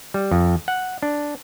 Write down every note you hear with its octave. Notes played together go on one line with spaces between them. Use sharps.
G3
F2
F#5
D4